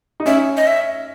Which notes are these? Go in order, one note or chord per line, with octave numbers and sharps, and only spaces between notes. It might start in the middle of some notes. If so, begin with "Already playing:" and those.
D#4
C#4 E5
D#5
E5